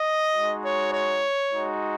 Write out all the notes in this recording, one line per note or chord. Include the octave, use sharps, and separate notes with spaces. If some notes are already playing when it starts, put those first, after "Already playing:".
Already playing: D#5
G#3 D#4 F#4
C#5
C#5
G#3 D#4 F#4